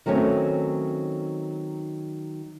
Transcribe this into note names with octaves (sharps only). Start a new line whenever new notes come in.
D#3 F#3 A3 C4 C#4